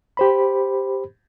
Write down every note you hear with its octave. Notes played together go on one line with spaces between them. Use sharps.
G4 C5 B5